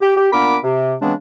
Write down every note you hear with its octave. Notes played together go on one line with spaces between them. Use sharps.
G4
G4
A#2 B3 D4 A#4 B5 D6
C3
C#3 E3 G#3 B3 C4 D4